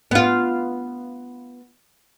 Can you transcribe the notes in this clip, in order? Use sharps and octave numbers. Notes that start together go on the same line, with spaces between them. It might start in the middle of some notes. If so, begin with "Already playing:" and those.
B3 F4